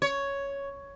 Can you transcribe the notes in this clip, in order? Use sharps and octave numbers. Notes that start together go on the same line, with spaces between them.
C#5